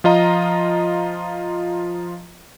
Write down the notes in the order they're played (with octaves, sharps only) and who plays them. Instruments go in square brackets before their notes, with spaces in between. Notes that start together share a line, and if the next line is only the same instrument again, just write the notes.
[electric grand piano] F3 F4 D#5 A#5